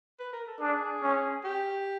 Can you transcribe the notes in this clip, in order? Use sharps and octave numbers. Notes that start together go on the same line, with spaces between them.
B4
A#4
A4
D4 G#4
C#4
G4